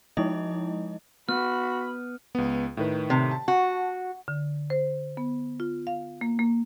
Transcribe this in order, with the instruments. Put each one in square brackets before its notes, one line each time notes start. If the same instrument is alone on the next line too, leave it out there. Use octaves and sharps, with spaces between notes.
[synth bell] F3 G#3 D#4 E4 D#5
[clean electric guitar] B3 [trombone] F#4 [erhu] B5 [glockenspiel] F6
[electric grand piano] C#2 B3
A2 D#3 B4
[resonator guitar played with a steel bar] C3
[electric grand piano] A5
[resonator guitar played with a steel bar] F#4
[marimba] D3
C5
B3
F4
F5
A#3
A#3